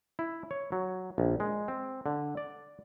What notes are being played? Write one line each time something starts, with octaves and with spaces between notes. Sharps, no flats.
E4
C#5
F#3
A#1
G#3
C4
D3
D5